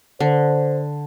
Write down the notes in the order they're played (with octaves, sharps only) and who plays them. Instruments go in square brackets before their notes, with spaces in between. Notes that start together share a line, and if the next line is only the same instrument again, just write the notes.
[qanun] D3 [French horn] C5